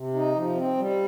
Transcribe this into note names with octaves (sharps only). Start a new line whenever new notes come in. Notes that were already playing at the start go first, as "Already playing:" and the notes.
Already playing: C3
D#4
F3
C4
G3